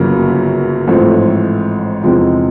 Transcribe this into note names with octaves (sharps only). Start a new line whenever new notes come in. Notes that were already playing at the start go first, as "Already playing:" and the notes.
Already playing: G1 F#2 C#3 F#3 A#3
A1 G#2 F3 A3 C4
E2 C3 F3 G#3